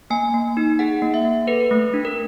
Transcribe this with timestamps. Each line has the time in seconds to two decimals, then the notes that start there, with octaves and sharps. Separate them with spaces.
0.10 A#3 G#5
0.34 A#3
0.57 D#4
0.79 G#4 F#5
1.02 A#3
1.14 E5
1.25 A#3
1.47 A4 B4
1.71 A3
1.94 D4
2.05 A#4